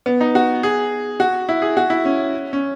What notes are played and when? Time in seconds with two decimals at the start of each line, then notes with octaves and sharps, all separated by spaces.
0.06 B3
0.21 D#4
0.35 F#4
0.63 G#4
1.20 F#4
1.49 E4
1.62 G#4
1.77 F#4
1.90 E4
2.05 C#4
2.53 C#4